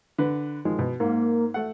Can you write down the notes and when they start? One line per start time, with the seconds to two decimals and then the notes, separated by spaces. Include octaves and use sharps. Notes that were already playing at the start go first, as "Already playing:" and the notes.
0.18 D3 B4
0.65 D#3 F3 G#3
0.79 B2
1.00 G#2 A#3
1.54 A3 F#5